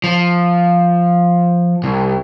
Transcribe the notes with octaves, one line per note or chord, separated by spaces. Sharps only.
F3
C2